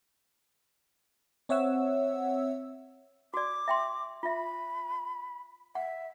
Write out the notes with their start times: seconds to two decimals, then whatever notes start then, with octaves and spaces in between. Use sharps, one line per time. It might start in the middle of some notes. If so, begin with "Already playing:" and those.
1.49 C4 C#5 E5 F#5 E6
3.34 F#4 D5 D6
3.68 E5 G5 C6
4.23 F4 E5 B5
5.75 E5 F#5